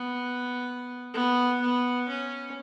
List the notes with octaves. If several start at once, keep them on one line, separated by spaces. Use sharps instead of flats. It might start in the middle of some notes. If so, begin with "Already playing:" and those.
Already playing: B3
B3
B3
C#4